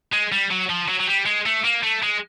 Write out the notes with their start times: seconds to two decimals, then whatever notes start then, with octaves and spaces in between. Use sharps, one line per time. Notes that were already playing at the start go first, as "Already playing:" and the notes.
0.13 G#3
0.32 G3
0.51 F#3
0.70 F3
0.89 F#3
1.00 F#3
1.08 G3
1.26 G#3
1.46 A3
1.65 A#3
1.83 A3
2.03 G#3